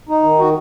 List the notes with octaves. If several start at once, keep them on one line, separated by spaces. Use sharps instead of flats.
D#4
D#3
F#4